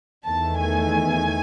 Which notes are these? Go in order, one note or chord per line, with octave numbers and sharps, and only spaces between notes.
E2 D#3 A3 A5
G#5